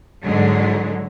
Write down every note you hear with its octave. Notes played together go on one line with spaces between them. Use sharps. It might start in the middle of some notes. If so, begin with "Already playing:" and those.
G#2 D3 F#3 G#3